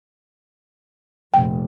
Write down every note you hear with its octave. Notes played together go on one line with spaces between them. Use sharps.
F1 A#1 G5